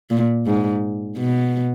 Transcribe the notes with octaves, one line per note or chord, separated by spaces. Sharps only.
A#2
G#2
B2